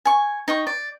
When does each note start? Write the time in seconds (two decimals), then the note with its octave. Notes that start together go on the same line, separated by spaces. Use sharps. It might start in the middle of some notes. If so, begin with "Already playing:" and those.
0.05 G#5 C#6
0.48 D#4 G5 C#6
0.67 D5